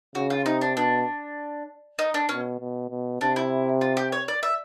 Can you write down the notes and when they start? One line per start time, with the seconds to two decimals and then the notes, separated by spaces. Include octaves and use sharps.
0.15 C#3 F#4
0.30 F4
0.46 C3 D#4
0.61 D4
0.77 B2 D4
1.99 D#4
2.14 D4
2.29 B2 C#4
2.60 B2
2.90 B2
3.21 C3 D4
3.36 E4
3.81 F4
3.97 G4
4.12 C#5
4.28 D5
4.43 E5